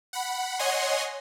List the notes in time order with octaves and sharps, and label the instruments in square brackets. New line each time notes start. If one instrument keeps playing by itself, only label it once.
[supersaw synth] F#5 B5
C#5 D#5 F#5 G#5 C6